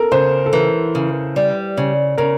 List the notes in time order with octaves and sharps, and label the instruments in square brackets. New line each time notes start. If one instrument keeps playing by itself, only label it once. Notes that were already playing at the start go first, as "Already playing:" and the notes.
Already playing: [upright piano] A4 A#4
[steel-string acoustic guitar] C#3 [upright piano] C5
[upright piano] A4
[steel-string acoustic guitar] E3 [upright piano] A#4
[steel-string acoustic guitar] C#3
G3
C#3
[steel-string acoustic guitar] C#3 [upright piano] A#4